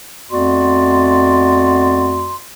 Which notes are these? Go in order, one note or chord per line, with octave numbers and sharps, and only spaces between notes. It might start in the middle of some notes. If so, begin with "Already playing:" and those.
F2 A3 B3 F#4 D5 C6